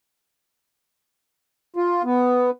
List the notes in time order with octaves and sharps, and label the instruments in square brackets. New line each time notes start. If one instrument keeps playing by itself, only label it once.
[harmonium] F4
B3